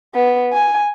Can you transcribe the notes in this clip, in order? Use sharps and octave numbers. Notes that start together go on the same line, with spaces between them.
B3
G#5